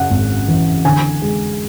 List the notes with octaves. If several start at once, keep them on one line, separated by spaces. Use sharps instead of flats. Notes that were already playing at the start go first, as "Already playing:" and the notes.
Already playing: F#2 C#3 F#5
G#1
E3
D3 G#5
G#3